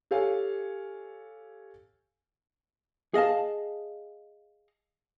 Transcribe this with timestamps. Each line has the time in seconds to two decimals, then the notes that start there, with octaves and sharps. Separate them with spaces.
0.11 G4 A4 C#5 F5 G#5
3.14 G#4 D#5 F5 A5